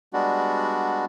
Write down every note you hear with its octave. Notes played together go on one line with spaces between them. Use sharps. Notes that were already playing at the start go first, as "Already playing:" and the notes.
G3 G#3 B3 D4 F#4